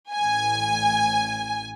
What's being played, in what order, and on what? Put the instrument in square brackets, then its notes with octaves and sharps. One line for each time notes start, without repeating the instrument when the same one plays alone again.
[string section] A1 G#5